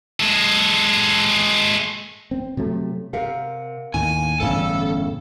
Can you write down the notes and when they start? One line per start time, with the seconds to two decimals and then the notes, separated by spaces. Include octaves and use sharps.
0.20 G#3 A4
2.31 C4
2.57 C3 F#3 A3
3.13 C3 A#4 F5 F#5
3.94 D#2 A2 G#5
4.40 G1 E2 A2 C#3 C#4 A4